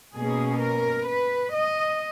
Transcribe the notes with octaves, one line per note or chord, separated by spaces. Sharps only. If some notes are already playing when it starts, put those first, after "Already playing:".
B2 A#3 C#4 G#4
A#4
B4
D#5